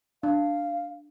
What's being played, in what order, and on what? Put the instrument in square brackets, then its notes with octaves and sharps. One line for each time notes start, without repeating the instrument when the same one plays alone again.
[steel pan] D4 [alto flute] F5